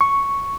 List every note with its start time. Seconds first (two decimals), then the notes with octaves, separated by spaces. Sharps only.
0.01 C#6